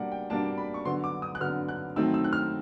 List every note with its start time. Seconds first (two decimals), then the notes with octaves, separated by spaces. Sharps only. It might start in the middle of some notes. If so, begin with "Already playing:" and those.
Already playing: B2 G3 A#3 D4 F#5
0.12 G5
0.30 B2 G3 A#3 D4 A5
0.58 B5
0.74 C#6
0.85 D3 F#3 B3 C6
1.04 D6
1.22 D#6
1.35 F#6
1.41 D3 F#3 B3 F6
1.69 F#6
1.96 D#3 F#3 A3 C4 D#4 E6
2.14 E6
2.24 F#6
2.33 F6